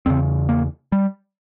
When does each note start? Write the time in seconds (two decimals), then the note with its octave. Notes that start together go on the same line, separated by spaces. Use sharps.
0.06 E2 C#3 C4
0.49 A#3
0.92 G3